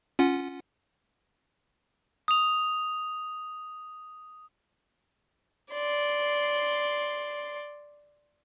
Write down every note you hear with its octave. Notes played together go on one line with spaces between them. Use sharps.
C#4 F4 F#5
D#6 F7
D5 C6